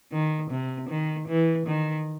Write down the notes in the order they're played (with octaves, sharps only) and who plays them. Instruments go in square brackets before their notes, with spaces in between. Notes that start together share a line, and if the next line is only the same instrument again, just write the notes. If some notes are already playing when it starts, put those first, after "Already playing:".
[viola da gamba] D#3
C3
D#3
E3
D#3